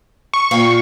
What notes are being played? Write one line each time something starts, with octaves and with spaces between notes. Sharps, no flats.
C#6
A#2 F5 G5